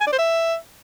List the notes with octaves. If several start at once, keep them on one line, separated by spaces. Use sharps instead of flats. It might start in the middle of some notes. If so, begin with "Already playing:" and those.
G#5
D5
C5
E5